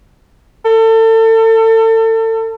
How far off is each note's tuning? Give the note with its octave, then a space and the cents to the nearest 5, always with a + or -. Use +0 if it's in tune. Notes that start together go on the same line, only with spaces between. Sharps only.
A4 +30